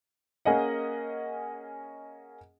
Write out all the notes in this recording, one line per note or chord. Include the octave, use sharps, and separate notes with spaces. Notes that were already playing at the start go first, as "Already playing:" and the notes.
A#3 C#4 G#4 D#5 F#5